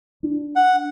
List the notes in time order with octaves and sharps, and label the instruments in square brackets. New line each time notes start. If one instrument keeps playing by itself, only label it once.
[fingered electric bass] D4
[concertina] F#5